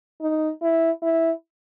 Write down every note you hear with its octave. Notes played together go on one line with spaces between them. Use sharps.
D#4
E4
E4